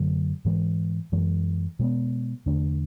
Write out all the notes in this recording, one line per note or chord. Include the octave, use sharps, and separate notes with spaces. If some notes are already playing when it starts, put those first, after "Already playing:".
Already playing: F#2 D3 F#3 A3
G#2 E3 G#3
F#2 E3 G#3
B2 G#3 B3
E2 D3 A3 D4